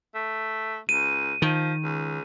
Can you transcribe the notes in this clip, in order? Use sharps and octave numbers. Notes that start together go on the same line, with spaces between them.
A3
C#2 D#7
D#3 F3
C#2